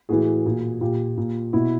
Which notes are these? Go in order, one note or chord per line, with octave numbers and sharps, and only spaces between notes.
A2 E3 F#4 G#4
A#2
A#2 F4 G4
A#2
B2 E4 F#4